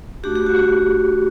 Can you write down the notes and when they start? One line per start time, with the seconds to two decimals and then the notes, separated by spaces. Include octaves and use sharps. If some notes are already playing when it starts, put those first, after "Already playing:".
0.23 A3 D4 F#4 G4
0.35 G4
0.47 F#4
0.56 G4